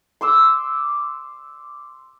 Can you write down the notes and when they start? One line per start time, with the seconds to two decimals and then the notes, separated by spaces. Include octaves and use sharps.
0.21 C6 D6 E6